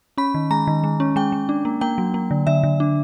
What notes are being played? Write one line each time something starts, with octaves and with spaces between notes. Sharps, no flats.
C#4 B5
D#3
G#3 A#5
D#3
G#3
C#4
G#3 G5
G#3
D4
A#3
A#3 G5
F#3
A#3
D3
D3 E5
D3
D4